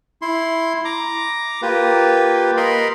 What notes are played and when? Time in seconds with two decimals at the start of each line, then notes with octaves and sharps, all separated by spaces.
0.22 E4 C6
0.85 A#5 D6
1.62 A#3 F4 G4 B4
2.57 A#4 D#5 B5 C6